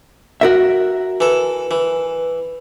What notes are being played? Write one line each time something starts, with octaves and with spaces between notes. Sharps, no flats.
F#4 A#4 E5
E3 A4
E3